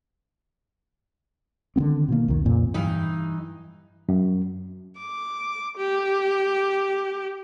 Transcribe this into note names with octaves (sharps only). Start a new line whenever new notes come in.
D3 D#3 B3 C4
B2 D#3 A#3
C2 F2 D#3
F2 A#2 C#3
G2 E3 D#4
F#2
D6
G4